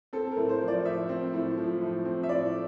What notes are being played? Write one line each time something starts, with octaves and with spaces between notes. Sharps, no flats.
C4 A4
A#4
A2
C5
F3
D5
A2 E5
C4
A2
F3
A2
C4
E5
A2 D5